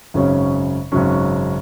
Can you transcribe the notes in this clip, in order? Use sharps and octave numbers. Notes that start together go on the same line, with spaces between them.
G#1 F#2 C#3 F#3 C#4
G#1 F#2 C#3 F#3 C#4